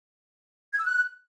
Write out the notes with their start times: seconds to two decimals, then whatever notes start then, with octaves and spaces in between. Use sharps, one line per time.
0.73 G#6
0.79 E6
0.85 F#6